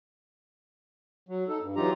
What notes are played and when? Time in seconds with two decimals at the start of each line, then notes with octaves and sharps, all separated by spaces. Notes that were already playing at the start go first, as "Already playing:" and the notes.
1.29 F#3
1.48 D#4 A4
1.61 G2
1.76 E3 F#3 D#4 F4 G4 A#5